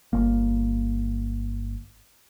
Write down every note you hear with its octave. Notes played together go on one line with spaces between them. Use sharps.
G1 A#3